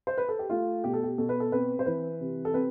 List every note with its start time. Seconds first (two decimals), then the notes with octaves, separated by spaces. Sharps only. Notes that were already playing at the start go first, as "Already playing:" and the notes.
0.07 C5
0.18 B4
0.29 A4
0.39 G4
0.50 A3 F4
0.84 B2 G4
0.94 A4
1.03 G4
1.18 B2 A4
1.29 B4
1.40 A4
1.52 C4 B4
1.79 C5
1.86 E3 B4
2.20 C3
2.45 A4
2.54 C4 B4